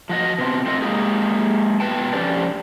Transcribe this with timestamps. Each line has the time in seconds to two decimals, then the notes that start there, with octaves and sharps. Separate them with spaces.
0.09 F3 F#4 D#5
0.38 B2 C4
0.66 A3 C4 F4 D#5
0.82 G#3 A#3 G4 G#4
1.80 B2 B4 G5 A5
2.13 D3 F3 C#4 G4 C5 D5